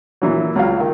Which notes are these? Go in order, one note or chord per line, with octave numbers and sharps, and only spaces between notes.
A#2 E3 F#3
C#2 F#3 F5
D#3